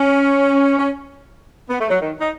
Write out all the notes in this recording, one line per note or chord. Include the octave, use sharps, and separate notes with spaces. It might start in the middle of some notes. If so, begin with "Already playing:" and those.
Already playing: C#4
C#4
B3
A3
F#3
D#3
D#4